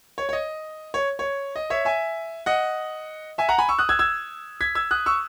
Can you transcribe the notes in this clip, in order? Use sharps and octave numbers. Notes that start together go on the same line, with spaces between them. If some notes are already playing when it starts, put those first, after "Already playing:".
C#5
C#5
D#5
C#5
C#5
D#5
C#5 E5
E5 G#5
D#5 F#5
E5 G#5
F#5 A#5
G#5 B5
C#6 E6
D#6 F#6
E6 G#6
E6 G#6
G#6 B6
E6 G#6
D#6 F#6
C#6 E6